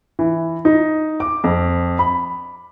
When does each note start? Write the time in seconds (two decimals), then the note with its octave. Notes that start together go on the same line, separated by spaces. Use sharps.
0.19 E3
0.65 D#4
1.20 D6
1.44 F2
1.99 B5